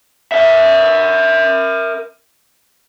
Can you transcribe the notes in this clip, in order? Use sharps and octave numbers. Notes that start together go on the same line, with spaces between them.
A#4 E5